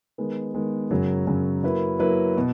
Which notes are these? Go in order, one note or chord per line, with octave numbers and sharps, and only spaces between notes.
D#3 G#3 B3
D#3 G#3 B3
F#2 C#3 F#3
F#2 C#3 F#3
F#3 A#3 E4 B4
F#3 A#3 E4 B4
B2